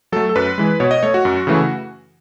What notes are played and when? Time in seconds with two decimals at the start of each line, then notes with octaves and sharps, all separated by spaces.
0.12 F#3 A3 A4
0.29 A4
0.36 F#2 B4
0.58 E3 G#3
0.80 B2 C#5
0.91 D#5
1.03 A3 C#5
1.14 F#4
1.25 F#2
1.47 C#3 E3 A3